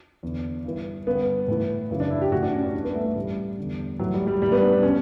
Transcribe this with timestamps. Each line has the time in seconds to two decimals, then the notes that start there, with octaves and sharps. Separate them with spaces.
0.23 E2 D3
0.64 G2 E3
1.07 G2 D3 B3
1.48 A2 E3
1.91 F#2 C#3 E3
2.00 D4
2.10 E4
2.21 G4
2.32 A2 E3 F#4
2.43 D4
2.52 C#4
2.63 D4
2.74 G2 E3 D4
2.84 B3
2.94 A3
3.06 A3
3.15 A2 E3 G3
3.58 E2 D3
3.99 A2 E3 F#3
4.14 G3
4.27 G3
4.42 A2 E3 G3
4.52 B3
4.62 D4
4.73 D4
4.83 B2 C#4